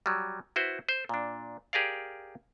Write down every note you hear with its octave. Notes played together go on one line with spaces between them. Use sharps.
F#3 G3
E4 F#4 B4 C5
C5
A#2 D4
G4 G#4 A#4 D5 F5